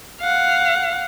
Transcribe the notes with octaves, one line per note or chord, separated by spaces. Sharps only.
F5 F#5